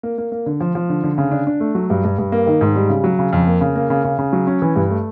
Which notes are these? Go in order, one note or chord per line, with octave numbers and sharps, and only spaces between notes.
A#3
A#3
A#3
D3
F3
F3
D3
D3
C#3
D4
D4
A3
F#3
G2
G2
G2
A#3
D#3
G#2
G3
C#3
F#3
C#3
F2
A#3
C#3
A#3
C#3
C#3
C#3
F#3
C#4
E3
G2
A3